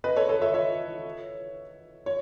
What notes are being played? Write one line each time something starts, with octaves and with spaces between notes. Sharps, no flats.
B4 D#5
A4 C#5
A4 C#5
C#5 E5
C#5 E5
C#5